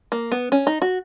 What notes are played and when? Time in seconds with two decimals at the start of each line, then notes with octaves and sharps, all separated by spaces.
0.12 A#3
0.32 B3
0.52 C#4
0.67 D#4
0.82 F#4